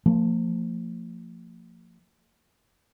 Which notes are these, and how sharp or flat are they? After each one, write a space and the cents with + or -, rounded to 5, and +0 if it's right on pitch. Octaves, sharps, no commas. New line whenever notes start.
F3 +0 A#3 -45